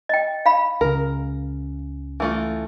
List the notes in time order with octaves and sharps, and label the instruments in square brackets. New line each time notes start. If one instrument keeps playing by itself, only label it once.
[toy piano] D#5 G5
F5 B5
[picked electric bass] C#2 C#3 [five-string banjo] A#4
[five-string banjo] E3 A3 F4